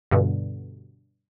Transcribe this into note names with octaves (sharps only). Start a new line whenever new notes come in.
G2 B2 D3